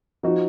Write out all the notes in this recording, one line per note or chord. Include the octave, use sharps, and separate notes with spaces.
F3 D#4 F#4